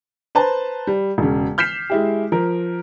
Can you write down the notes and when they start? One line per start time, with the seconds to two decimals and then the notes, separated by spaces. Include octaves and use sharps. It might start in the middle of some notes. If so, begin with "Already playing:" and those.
0.35 B4 C5 A5 A#5
0.87 G3
1.18 E1 C#3
1.58 F6 G6 B6 C7 E7
1.90 G#3 E4 G4
2.32 F3 A#4